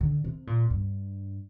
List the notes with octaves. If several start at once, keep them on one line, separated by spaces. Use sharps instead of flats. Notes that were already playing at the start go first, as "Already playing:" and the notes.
D3
C3
A#2
G2